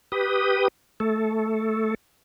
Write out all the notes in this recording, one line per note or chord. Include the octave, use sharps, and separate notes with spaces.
G4 B4 D#6
A3 A4